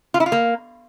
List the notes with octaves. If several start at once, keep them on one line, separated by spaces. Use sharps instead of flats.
F4
E4
F4
A#3